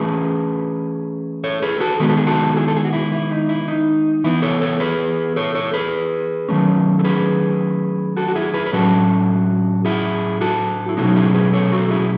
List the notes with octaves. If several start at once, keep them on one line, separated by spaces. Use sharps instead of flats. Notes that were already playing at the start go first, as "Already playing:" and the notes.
Already playing: E3 A3 C#4 G#4 B4
A4 C#5
G#4 B4
F#4 A4
D#3 G#3 B3 B4
A4
G#4
F#4 A4
E4 G#4
A4
G#4
F#4
E4
E4
D#4
E4
D#4
E3 B3 E4
A4 C#5
A4 C#5
G#4 B4
A4 C#5
A4 C#5
G#4 B4
D#3 F#3 A3 C#4
A4
G#4 B4
F#4 A4
F#4
E4 G#4
G#4 B4
B4
A2 F#3 C#4 F#4 A4
E4 G#4
F#4 A4
E4
B2 F#3 A3 C#4 D#4 F#4
E4 G#4
G#4 B4
A4 C#5
F#4 A4
E4 G#4